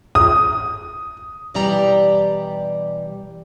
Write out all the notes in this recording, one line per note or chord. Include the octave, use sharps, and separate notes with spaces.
D#6
B2 E3 G3 G4 D5 A#5